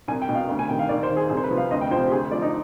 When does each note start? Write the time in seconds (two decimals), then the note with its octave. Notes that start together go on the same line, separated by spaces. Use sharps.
0.08 C2 G#5
0.22 G5
0.29 B2
0.35 F5
0.49 D2
0.59 G#5
0.69 C3 D#3 G5
0.79 F5
0.89 D#2 D5
1.03 C5
1.10 D#3
1.17 G#4
1.30 C2 G#4
1.37 C5
1.44 B4
1.51 C3 F3
1.58 F5
1.71 D2 D#5
1.81 G5
1.91 F3 C5
1.94 C3
2.07 G4
2.11 D2 G#4
2.31 D3 F3 D5
2.42 D#4